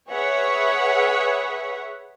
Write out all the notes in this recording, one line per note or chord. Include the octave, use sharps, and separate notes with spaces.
G#4 B4 C#5 E5 F#5